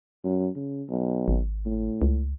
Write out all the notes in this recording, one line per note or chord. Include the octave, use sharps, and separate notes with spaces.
F#2
C#3
B1
G#1
A2
C#2